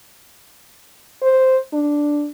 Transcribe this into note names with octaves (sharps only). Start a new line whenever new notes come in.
C5
D4